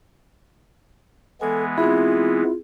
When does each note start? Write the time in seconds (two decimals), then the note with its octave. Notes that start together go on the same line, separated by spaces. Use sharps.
1.41 E3 G#3 B3 A4 G#5 D#6
1.78 C4 E4 F4 G#4